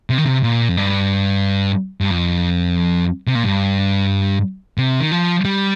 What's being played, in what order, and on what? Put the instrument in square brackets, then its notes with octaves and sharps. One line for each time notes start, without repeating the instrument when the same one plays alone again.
[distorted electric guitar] C3
D#3
C3
A#2
F2
G2
G2
F2
C3
A#2
G2
C3
D#3
F3
G3